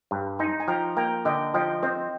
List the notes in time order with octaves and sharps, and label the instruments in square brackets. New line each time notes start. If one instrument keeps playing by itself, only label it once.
[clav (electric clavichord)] G2
[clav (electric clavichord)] D#4 [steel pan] G#5 C6
[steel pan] G#5
[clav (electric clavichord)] F3 [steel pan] G5 A#5
[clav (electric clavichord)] A#3 [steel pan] G5 A#5
[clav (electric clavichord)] D3 [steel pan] D#5 G5
[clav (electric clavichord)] F3 [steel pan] D#5 G5
[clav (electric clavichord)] C4 [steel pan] C5 D#5